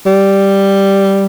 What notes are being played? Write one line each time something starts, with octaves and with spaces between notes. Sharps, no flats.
G3